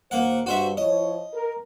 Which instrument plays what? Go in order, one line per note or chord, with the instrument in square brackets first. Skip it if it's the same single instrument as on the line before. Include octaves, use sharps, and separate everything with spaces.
[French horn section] D#2 A#2 C5 [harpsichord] A#3 F#5
[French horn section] G2 [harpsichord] F#4 C5 E5
[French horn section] F3 E4 C#5 [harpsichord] D#5
[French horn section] A#4